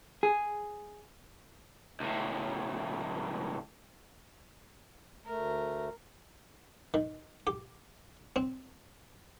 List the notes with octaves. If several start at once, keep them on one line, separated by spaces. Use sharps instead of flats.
G#4
C#2 A2
D2 A3 A#4
D#3
G4
C4